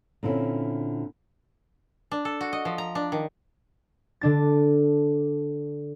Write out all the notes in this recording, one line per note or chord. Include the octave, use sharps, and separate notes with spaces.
A#2 D3 C4 C#4 E4
D4
A4
F#4
D#5
F3
A#5
D4
D#3
D3 D4 A6